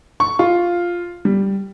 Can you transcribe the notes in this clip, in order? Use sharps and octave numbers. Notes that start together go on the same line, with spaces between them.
C#6
F4
G3